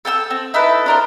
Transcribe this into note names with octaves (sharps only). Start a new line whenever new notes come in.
A4 G5 G#5 E6
C4
D#4 E4 A4 B4
D4 A#4 C5